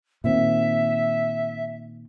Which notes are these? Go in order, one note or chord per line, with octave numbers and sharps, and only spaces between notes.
A#2 D#3 C4 E5